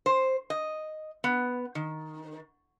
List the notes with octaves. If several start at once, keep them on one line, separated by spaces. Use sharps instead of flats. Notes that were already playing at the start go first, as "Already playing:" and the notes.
C5
D#5
B3
D#3